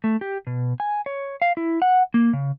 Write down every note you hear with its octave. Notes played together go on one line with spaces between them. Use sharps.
A3
G4
B2
G#5
C#5
F5
E4
F#5
A#3
C#3